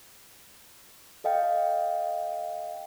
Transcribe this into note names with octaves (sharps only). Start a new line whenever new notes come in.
A4 D#5 F5 G5